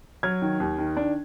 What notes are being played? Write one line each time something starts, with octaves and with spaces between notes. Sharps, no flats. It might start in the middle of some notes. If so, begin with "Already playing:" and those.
F#3 F6 G#6
D#3
D#2
D#3
D4